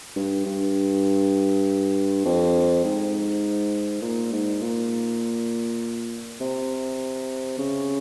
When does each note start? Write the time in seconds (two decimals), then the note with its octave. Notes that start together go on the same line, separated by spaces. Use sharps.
0.16 G2
0.46 G2
2.25 F2
2.84 G#2
4.02 A#2
4.32 G#2
4.62 A#2
6.41 C3
7.58 C#3